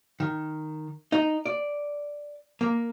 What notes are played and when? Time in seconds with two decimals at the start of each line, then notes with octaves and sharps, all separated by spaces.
0.20 D#3
1.12 D#4
1.46 D5
2.61 A#3